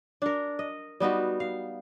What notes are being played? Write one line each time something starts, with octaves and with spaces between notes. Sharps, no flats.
D4 A#4
D#5
G3 B3 D#4 F#4
F5